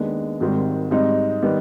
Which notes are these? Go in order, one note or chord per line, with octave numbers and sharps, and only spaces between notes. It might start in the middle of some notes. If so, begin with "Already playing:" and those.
Already playing: D#2 D#3 G#3 B3 D4
G#1 G#2 D#3 G3 C4
G#2 G3 C4 D#4
D#3 G3 B3 D#4